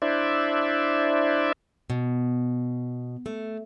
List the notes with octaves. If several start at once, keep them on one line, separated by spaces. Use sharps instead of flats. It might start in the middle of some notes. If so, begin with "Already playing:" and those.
D4 E4 C5 D5 E5
B2
A3